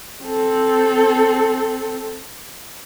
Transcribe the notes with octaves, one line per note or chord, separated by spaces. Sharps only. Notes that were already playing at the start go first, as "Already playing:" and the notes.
C4 A4